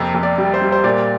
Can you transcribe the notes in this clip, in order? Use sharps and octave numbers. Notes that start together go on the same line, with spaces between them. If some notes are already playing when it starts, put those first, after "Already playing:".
Already playing: F2 C3 A#3
F2
D5
G3
C5
G3
C5
A#2 D5